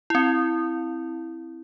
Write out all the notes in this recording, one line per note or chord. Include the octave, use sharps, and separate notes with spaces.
C4 E4